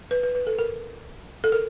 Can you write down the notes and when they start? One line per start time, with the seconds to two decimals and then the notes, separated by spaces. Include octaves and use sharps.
0.11 B4
0.23 B4
0.35 B4
0.47 A4
0.59 A#4
1.44 A4
1.52 A#4